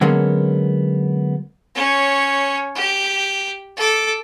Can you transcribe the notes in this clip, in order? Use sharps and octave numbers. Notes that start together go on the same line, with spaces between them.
D3 F#3 G#3 A#3 B3 C#4
C#4 C#5
G4
A4 D6